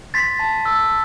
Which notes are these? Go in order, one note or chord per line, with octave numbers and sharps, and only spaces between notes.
C6 A6 B6
A5
E6